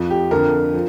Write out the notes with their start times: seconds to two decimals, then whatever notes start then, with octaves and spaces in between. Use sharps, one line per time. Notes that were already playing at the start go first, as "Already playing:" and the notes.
Already playing: F2 F3
0.10 G4
0.31 F2 D3 F3 A#4
0.74 F3